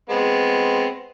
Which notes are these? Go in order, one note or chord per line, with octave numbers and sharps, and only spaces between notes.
G#3 B3 C4